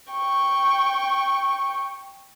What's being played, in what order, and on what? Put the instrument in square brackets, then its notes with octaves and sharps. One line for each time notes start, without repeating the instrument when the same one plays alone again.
[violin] G5 C#6